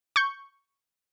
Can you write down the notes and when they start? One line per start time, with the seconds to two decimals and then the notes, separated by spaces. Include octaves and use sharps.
0.16 C#6 G6